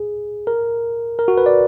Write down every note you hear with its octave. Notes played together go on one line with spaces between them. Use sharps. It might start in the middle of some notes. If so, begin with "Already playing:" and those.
Already playing: G#4
A#4
A#4
F#4
B4
D5